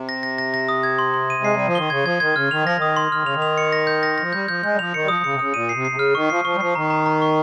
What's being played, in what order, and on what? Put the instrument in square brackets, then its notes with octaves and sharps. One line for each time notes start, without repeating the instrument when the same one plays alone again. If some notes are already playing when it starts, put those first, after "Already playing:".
Already playing: [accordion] C3
[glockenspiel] A#6
A#6
A#6
A#6
D#6
G#6
C6
C6
D#7
[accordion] G#3 [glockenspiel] C7
[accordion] G3 [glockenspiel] D#7
[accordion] F3
[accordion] D#3 [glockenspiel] G7
[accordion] C#3 [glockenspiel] G#6
[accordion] F3 [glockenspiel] G#6
[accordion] D#3 [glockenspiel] G#6
[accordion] C#3 [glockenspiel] F6
[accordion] D#3 [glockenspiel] F7
[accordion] F3 [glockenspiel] A#6
[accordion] D#3 [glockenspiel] D#6
[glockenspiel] C6
[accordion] D#3 [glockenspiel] F6
[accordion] C#3 [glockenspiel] F7
[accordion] D#3
[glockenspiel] F7
C#7
A#6
G6
A#6
[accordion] F3 [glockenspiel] A#6
[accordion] G3 [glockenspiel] G6
[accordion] F3 [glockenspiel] G6
[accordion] G#3 [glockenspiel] G6
[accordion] G3
[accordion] F3 [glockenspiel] F7
[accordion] D#3 [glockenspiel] C#7
[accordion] G3
[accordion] F3 [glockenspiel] D#6
[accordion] C#3 [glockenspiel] C#7
[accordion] C3
[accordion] C#3 [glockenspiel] D#6
[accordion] A#2 [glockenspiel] D#7
[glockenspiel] C7
[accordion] C3
[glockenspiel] C7
[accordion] C3
[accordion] C#3 [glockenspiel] F6
[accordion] D#3 [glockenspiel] C#6
[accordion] F3 [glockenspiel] C7
[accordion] F3 [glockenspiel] C#6
[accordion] G3
[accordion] F3 [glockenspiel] C7
[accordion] D#3 [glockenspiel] A#5
[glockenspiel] A#5
A#5
C#6